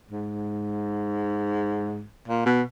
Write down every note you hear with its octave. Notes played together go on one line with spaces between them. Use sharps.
G#2
A#2
B2